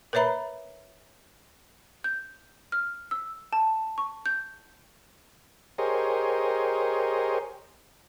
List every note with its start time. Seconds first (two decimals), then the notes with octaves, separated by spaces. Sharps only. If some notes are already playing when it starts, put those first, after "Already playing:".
0.13 A#4 B4 C#5 E5 A#5 B5
2.04 G6
2.72 F6
3.11 E6
3.53 A5
3.98 C#6
4.26 G6
5.78 G4 G#4 A#4 C5 C#5 D#5